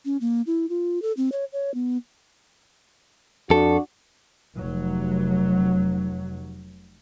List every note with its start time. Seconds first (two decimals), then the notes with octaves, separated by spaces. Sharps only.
0.05 C#4
0.21 A#3
0.47 E4
0.69 F4
1.02 A4
1.17 C4
1.32 C#5
1.53 C#5
1.74 B3
3.50 F2 D4 F#4 A4
4.57 F1 F#3